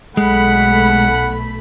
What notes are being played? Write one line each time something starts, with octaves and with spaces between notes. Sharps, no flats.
B1 G#3 A3 F#5 B5